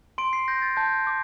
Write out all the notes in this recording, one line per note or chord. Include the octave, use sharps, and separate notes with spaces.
C6 D7
C7
G6 A#6
A6
A5 G6
D6